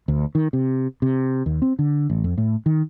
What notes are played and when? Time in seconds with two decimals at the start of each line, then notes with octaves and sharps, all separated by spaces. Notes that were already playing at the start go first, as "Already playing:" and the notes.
0.08 D2
0.35 D#3
0.53 C3
1.02 C3
1.46 D#2
1.62 C4
1.79 D3
2.10 A1
2.24 F2
2.37 A2
2.66 D#3